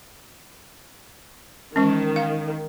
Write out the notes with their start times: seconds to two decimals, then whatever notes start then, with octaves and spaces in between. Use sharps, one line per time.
1.76 D#3 E3 G#3 C#4
2.16 F5